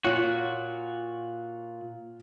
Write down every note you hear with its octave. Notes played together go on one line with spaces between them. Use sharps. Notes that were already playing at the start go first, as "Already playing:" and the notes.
A#2 F4 F#4 C#5